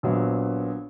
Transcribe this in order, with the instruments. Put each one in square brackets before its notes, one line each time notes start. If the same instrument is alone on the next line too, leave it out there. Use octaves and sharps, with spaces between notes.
[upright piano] A#1 A#2 F#3 B3